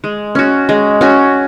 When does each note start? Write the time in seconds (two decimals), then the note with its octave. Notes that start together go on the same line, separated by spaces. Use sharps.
0.04 G#3
0.35 C#4 F#4
0.69 G#3
1.01 C#4 F#4